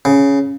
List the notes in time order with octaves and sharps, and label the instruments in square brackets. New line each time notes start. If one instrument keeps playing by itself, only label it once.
[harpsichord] C#3